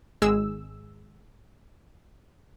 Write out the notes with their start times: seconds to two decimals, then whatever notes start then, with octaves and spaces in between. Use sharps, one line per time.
0.22 G#1 G#3 G#4 E6